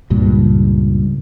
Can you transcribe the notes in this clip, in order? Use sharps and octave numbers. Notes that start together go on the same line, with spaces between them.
C#2 G2 A#2